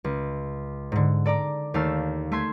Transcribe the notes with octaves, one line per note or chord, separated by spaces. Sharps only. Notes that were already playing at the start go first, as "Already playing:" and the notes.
C#2
G#2 D3
A4 D5 A#5 D6
D#2 A3 F5 A5 E6
A3 E5 C6 G#6